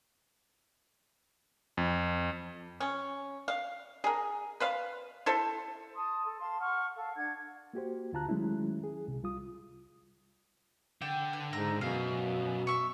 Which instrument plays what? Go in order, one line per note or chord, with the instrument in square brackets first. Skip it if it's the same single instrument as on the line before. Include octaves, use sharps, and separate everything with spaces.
[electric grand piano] F2
[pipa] C#4
F5
G#4 A#4
B4 C5 F5
E4 A4 C5
[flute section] A5 C6 D#6
A4
F5 A5 C6
F#5 C#6 F6
A4 F5
D4 F#5 G#6
[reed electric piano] A#3 F#4 G4 C5
D2 D3 F4 A5 A#5 F#6
D#3 F#3 G#3 A3 C#4 E4
G#4
C2 C3
C2 G3 F4 D#6
[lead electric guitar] D3 [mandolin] G5
[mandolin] B4
[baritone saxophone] G#2 [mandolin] E5 A#5
[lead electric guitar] F#2 [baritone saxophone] B2 [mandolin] F5
[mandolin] E5 C#6